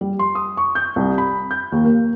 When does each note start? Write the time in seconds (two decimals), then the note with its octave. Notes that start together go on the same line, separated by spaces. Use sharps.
0.01 G3
0.19 C6
0.35 D#6
0.57 C#6
0.75 G6
0.96 C2
1.18 B5
1.51 G6
1.72 D#2
1.85 A#3